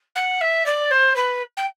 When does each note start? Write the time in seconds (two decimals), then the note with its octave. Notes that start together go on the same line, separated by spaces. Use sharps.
0.15 F#5
0.40 E5
0.65 D5
0.90 C5
1.15 B4
1.56 G5